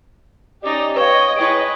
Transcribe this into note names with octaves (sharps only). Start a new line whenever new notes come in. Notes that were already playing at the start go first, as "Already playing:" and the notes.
C#4 D#4 G4 D5 D#5
B4 C#5 D#5 F5 G5
G#3 E4 B4 C#5 G5 D7